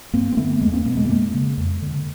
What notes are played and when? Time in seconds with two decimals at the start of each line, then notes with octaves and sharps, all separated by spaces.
0.13 G2 A#3 C4
0.32 C4
0.37 D3 A3 B3
0.61 E2 G#3 A#3
0.73 A#3 C4
0.85 B2 A3 B3
0.97 G#3 A#3
1.05 B3
1.09 F#2 G#3 A#3
1.34 C#3
1.58 F2
1.82 D3